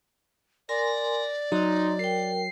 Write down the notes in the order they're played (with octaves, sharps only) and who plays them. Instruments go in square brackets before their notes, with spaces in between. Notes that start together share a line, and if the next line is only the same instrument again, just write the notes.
[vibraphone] A#4 G#5 C6 [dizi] D5 [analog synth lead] A#6
[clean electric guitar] F#3 [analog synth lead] D#4 [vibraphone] A#5 C6
[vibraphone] A#4 G5 [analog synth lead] C7